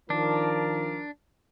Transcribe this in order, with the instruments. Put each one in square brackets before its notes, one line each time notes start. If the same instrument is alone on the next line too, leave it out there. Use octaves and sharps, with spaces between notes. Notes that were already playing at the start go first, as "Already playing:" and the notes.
[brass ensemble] D#3 F3 A#4 [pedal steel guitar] D4